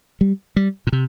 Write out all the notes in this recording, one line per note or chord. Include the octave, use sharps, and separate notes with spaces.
G3
G3
A#2
C3